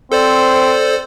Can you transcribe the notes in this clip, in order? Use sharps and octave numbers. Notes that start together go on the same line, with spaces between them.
C4 A4 C5 D5